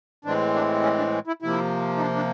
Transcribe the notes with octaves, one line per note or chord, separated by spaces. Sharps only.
A2 E3 G#3 C4 D4
D4
C#4
D4
E4
C3 F3 A#3 E4
D#4
D4
D4